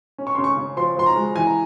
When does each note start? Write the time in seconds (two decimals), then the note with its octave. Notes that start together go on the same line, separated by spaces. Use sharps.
0.18 C#4
0.27 C#6
0.35 C#3 C6
0.44 C#6
0.57 C#3
0.77 F3 C6
0.96 F3 C6
1.06 A#5
1.16 G#3
1.36 E3 G#5
1.47 A#5